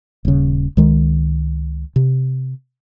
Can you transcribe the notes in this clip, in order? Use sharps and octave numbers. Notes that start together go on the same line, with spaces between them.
D#1 C#3
C#2 D#3 G#3
C3